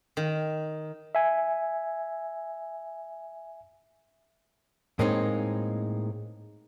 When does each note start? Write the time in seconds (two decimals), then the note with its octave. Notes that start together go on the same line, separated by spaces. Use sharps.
0.17 D#3
1.15 E5 G#5
4.99 A2 G#3 A#3 C4 D#4